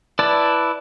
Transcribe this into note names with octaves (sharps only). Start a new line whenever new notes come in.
E4 B4 D5 A5